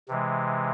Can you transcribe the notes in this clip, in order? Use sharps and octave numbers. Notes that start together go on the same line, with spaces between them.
C3 E3 G#3